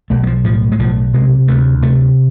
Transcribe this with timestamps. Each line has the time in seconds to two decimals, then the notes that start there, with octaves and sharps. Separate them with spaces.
0.10 B1 A3
0.23 G#3
0.27 F3
0.44 A2 F3
0.72 G#3
0.79 B1 F3
1.13 C3 G#3
1.48 D2 A3
1.82 C3 A3